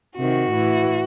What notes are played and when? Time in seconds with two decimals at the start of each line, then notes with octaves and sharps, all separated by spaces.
0.18 C3 D#3 F#4
0.51 A2 E3